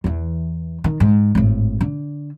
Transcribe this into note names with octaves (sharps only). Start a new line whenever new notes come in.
E2 E3
D#3
G#2
G#1 A2
D3